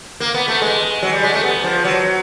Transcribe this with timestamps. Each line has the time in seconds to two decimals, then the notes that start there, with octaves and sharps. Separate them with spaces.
0.20 A#3
0.34 B3
0.48 A3
0.62 G#3
1.02 F#3
1.13 G3
1.23 G#3
1.33 A3
1.43 B3
1.64 F3
1.84 F#3